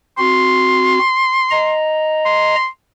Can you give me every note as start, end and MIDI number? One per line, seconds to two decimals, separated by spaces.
0.18 0.99 60
0.18 0.99 66
0.18 1.76 84
1.51 2.55 75
1.51 2.55 82
2.26 2.67 84